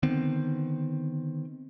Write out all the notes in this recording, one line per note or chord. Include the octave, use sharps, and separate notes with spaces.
D3 D#3 B3 C4